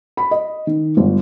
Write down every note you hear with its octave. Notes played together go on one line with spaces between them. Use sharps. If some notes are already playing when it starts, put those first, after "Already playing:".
B5
D#5
D#3
G1